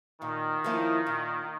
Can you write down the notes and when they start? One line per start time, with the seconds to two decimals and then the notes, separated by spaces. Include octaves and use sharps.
0.21 A#2 D#3
0.64 F3 A#3 C#4 E4
1.07 A#2